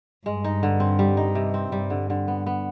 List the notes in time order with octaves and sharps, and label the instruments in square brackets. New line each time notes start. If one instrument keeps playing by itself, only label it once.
[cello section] G2 [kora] G#3
[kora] D#4
D3
C4
G3
D#4
C3
C4
[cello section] G2 [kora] G3
[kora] D3
D3
B3
B3